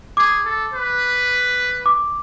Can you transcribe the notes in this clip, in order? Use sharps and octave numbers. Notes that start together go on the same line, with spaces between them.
G#4 D6
A4
B4
D6